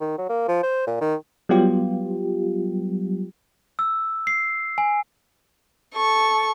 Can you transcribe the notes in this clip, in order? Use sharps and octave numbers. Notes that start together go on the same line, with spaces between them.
D#3
F#3
A#3
F3
C5
A#2
D#3
F#3 G3 B3 F4 G4
E6
C7
G#5
A4 C#6